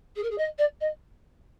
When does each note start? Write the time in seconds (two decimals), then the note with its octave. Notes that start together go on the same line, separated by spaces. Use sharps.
0.16 G#4
0.23 A#4
0.30 G#4
0.38 D#5
0.58 D5
0.80 D#5